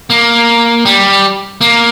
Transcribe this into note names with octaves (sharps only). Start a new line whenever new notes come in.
A#3
G3
A#3